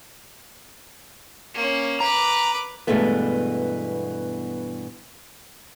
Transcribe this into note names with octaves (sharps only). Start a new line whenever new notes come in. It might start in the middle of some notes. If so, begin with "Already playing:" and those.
A#3 C#4
B4 A#5 D6
G2 B2 E3 G#3 A3 B3